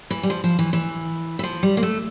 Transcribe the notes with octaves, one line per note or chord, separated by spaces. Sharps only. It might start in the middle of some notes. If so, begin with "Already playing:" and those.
E3
G3
F3
F3
E3
E3
E3
F3
G3
A#3
A3